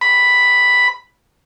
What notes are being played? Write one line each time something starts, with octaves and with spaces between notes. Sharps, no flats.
B5